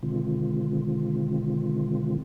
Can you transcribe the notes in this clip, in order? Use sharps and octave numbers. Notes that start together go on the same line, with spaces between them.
B2 D3 D#3 G#3 C4 F4